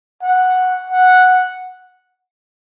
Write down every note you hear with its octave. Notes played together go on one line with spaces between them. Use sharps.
F#5
F#5